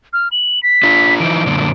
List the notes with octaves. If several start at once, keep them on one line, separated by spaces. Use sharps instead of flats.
F6
F#7
B6
D4 F4
E3 F3 D#4 D7
F#2 A#2 D3